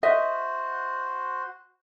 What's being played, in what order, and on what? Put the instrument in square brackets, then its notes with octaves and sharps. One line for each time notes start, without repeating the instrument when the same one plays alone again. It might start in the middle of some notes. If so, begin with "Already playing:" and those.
[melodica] F#4 C5 [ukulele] D#5 E5